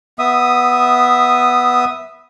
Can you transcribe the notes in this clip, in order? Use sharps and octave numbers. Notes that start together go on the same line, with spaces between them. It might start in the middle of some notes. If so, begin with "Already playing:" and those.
B3 E5 D#6